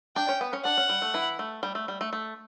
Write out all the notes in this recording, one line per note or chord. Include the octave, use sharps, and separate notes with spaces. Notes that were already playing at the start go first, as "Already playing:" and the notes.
D4 D5 G5
C#4 C#5
B3 B4
C#4 C#5
D4 F#5
C#4
G3
A3
E3 E4
A3
G3
A3
G3
A3
A3